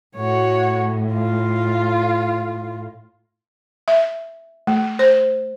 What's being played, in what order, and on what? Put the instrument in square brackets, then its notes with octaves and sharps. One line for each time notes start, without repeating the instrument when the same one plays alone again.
[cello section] A2 [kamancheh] F#4 C#5
[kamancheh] F4
[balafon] E5
A3
C5